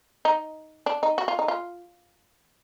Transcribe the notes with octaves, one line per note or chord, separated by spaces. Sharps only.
D#4
D4
D#4
F#4
F4
D#4
F4